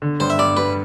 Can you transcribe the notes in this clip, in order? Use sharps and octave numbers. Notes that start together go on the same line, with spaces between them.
D3
G2 C5
E5
G2 D5
G3 B4